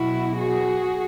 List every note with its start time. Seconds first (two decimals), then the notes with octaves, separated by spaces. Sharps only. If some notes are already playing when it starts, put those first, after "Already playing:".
Already playing: B2 F#3 E4 F#4
0.37 F#4 G#4